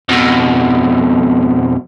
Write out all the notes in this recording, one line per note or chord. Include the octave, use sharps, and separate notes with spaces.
F2 B2